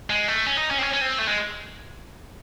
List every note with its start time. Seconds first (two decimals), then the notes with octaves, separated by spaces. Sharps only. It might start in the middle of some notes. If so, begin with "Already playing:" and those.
0.10 G#3
0.28 A3
0.47 C#4
0.58 D#4
0.71 C#4
0.78 C4
0.82 C#4
0.93 C#4
1.01 C4
1.19 A3
1.28 G#3